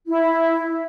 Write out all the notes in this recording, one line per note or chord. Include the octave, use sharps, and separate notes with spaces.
E4